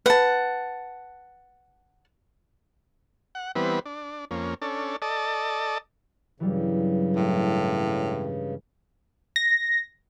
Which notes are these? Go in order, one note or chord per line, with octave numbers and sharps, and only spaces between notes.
B4 F#5 A5
F#5
E3 G3 B3 C4 B4
D4
F2 A#3 C#4
C#4 D4 A4
A4 D5 D#5 A5
G2 C#3 E3 F#3 G3
A2 G#3
A#6